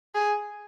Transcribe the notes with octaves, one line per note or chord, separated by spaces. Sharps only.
G#4